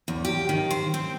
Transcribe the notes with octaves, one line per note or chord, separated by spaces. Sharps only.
E2
G4
D#3
C5
C4